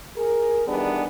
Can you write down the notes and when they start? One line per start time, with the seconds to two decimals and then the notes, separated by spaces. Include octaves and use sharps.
0.16 G#4 A#4
0.67 D#3 E3 G3 B3 D4 G#4